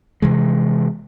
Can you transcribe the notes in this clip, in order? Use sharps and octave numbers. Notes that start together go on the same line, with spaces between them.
C3 E3 G#3